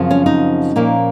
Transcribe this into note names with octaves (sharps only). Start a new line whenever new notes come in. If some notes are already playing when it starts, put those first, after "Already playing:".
Already playing: F#2 C#3 F3 C4
C#4
D#4
A#2 F3 A#3 C#4